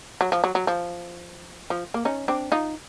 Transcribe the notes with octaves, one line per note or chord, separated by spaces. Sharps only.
F#3
F3
F#3
F#3
F3
F3
A#3
C#4 D#4
C4 D4
D#4 F4